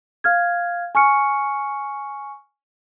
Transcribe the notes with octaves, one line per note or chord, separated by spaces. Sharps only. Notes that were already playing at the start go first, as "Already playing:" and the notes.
F5 F6 G#6
G#5 C#6 F6 C#7